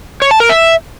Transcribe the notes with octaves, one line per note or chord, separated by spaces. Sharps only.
C#5
A5
A#4
E5